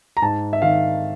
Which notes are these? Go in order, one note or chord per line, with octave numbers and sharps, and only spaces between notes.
A#5
G#2 A5
E5
D#3 F5